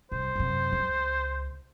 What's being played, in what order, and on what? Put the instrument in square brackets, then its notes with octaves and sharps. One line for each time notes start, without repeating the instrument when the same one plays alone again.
[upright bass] C2 [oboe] C5
[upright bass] F#2 C3
C#2